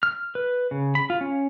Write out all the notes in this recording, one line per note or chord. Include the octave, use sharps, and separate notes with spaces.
F6
B4
C#3
B5
F4
C#4